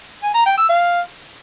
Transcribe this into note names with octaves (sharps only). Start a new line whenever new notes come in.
G#5
A#5
G5
E6
F5